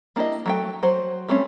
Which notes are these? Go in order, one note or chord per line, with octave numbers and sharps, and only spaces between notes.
A#3 D4 E4 G4 D#5
F#3 A3 G5
F#3 F#4 C5
G3 A3 C4 C#4